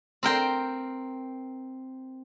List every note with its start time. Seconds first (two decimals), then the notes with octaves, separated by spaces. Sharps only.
0.23 C4 A#4 G5 C6